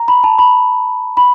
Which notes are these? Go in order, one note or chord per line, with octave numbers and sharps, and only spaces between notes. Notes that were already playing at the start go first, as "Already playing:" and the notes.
Already playing: A#5
B5
A5
B5
B5